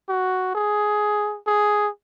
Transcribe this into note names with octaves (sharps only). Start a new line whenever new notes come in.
F#4
G#4
G#4